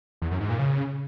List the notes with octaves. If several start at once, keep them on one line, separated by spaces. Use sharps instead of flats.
E2
F#2
G#2
A#2
C#3